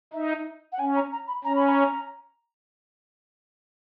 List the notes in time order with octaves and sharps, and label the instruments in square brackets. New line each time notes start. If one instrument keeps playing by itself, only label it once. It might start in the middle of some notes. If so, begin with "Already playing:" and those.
[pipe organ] D#4 [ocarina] E5
[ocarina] F#5
[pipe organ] C#4 [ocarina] G#5
[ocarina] A#5
A#5
B5
[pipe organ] C#4 [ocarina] A#5
[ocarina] B5
A#5